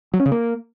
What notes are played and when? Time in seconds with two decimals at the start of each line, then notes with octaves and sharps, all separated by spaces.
0.13 F#3
0.20 C#4
0.26 C#3
0.32 A#3